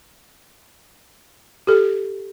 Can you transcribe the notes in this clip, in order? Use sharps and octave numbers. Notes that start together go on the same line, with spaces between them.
G4 A4